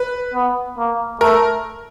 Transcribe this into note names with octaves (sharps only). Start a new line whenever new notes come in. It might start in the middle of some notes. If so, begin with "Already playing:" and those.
Already playing: B4
B3
A#3
A3 A#4